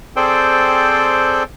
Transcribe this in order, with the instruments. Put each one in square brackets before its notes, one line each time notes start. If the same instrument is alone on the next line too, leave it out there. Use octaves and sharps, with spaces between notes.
[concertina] C4 G#4 A4 C5 D5 G5